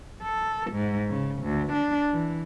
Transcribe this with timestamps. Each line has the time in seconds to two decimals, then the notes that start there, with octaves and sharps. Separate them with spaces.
0.22 A4
0.71 G#2
1.10 C#3
1.42 D2
1.72 D4
2.13 E3